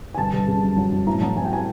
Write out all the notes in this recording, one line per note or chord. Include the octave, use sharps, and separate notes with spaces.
G#5
G1 A5
G1
C#3
F#2
F#3
F#3
A2 A#5
F#3 A5
F#3 G#5
G5
G#5